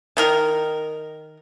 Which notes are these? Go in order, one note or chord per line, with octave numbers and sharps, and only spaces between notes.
D#3 D#4 A#4